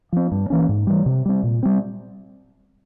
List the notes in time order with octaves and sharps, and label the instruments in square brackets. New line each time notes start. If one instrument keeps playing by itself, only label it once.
[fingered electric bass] F3 C4
G2
E3 A#3 C#4
G#2
E3 G3
C3
G3 C4
A#2
G3 C4